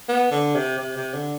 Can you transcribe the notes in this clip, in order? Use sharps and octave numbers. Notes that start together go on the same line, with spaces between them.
B3
D3
C3
C3
C3
D3